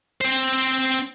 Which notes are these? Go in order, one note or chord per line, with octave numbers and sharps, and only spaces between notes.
C4 C5